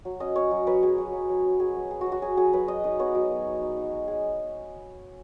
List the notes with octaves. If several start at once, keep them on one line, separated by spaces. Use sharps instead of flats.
F#3
C#4 D#5
C#4 C#5
F#3
F#3 B4
F#3 G#4
F#3
F#3
F#3
C#4
F#3 G#4
F#3
F#3 G#4
F#4
F#3
F#4
F#3 G#4
F#3 G#4
F#3 B4
F#3 D#5
D#4 D#5
B3 C#5
F#3
B3
D#4
D#4
D#4
G#3
G#3 G#4